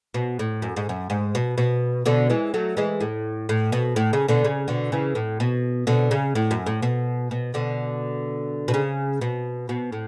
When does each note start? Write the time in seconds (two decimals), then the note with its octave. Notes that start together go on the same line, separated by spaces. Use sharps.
0.14 B2
0.39 A2
0.62 F#2
0.76 G#2
0.89 F#2
1.10 G#2
1.35 B2
1.58 B2
2.06 B2 D3
2.30 E3 G#3
2.54 F#3 A3
2.77 E3 G#3
3.01 A2
3.49 A2
3.72 B2
3.96 A2
4.13 C#3
4.28 B2 D3
4.44 C#3
4.68 B2 D3
4.92 C#3 E3
5.15 A2
5.40 B2
5.87 B2 D3
6.11 C#3
6.35 A2
6.51 F#2
6.66 A2
6.82 B2
7.31 B2
7.54 B2 D3
8.68 B2
8.74 C#3
9.21 B2
9.69 B2
9.92 A2